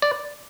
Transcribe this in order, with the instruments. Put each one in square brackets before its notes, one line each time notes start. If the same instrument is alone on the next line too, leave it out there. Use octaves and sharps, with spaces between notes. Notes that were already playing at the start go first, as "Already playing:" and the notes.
[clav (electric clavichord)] D5